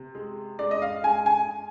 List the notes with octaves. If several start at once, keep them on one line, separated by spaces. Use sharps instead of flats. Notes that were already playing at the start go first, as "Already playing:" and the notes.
Already playing: C3
G#3
G#3 D5
D#5
F5
G#3 G#5
G#5